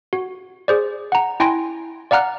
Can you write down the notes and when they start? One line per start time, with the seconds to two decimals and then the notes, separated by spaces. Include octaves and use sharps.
0.13 F#4
0.68 G#4 C5 D5
1.12 F#5 A#5
1.40 E4 G5 G#5 C6 A#6 D7
2.11 D5 F5 F#5 A#5 F6 F#6